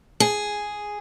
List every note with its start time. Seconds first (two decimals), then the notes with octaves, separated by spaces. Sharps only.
0.20 G#4